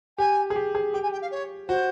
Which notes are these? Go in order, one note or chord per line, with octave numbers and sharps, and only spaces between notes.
G4 G#5
G#4
G4
G#4
G4 G5
G#5
G5
F5
C#5
F#4 C5